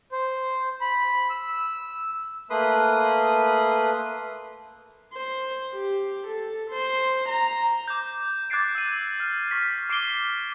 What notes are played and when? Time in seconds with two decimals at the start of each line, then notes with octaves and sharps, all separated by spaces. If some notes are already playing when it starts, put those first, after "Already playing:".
0.12 C5
0.81 B5
1.30 E6
2.50 A3 A#3 B4 B5 C6 D#6
5.13 C5
5.72 G4
6.27 A4
6.70 C5
7.29 A#5
7.88 D6 G6
8.50 D6 F#6 G#6 A6 C7 D7
8.75 E6 D#7
9.20 F6
9.51 C#6 B6
9.89 D6 C7 D7 D#7 G7